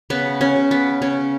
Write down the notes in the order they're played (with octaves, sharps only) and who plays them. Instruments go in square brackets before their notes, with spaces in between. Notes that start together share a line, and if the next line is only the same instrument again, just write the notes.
[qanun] C#3 B3
C#4
C#3
B3
C#3 C#4